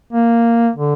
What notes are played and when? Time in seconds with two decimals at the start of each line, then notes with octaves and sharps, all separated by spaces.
0.13 A#3
0.76 D3